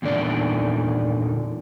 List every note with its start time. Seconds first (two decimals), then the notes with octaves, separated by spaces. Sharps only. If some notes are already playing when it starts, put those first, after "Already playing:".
0.02 E2 A#2 D3 D#3 D5